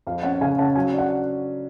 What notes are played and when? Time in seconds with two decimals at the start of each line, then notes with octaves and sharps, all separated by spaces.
0.07 F2 F5
0.23 C#4 F#5
0.41 C#3 F5 G#5
0.58 C#4 F#5 A5
0.76 F#3 F5 G#5
0.93 D4
0.98 F#5